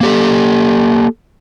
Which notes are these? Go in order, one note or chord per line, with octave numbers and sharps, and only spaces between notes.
A#3 G4 A4